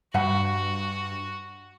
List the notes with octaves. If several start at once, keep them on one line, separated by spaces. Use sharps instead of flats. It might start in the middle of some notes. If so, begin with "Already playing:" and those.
G2 F#4 B4 F#5 B5